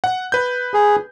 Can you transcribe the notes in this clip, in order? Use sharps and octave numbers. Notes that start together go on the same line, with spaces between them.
F#5
B4 G6
G#4